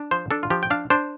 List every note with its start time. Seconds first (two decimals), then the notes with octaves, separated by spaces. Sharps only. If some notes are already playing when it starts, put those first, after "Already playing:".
Already playing: D4
0.11 F3 C5
0.31 D4 A4
0.43 F4
0.50 F3 G4
0.63 G5
0.70 D4 F5
0.90 D4 C5